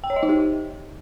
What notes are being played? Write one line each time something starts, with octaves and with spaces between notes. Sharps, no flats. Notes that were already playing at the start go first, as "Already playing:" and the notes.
G5
C#5
D#5
D#4
G4